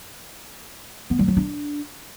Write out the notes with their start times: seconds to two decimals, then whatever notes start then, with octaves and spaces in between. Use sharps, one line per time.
1.10 B3
1.19 G3
1.28 F#3
1.37 D4